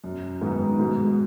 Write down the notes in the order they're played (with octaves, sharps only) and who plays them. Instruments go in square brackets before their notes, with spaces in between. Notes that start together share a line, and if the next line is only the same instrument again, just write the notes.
[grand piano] F#2
[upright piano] G#2 [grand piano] D#3 B3 D#4
[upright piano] G#2 [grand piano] B2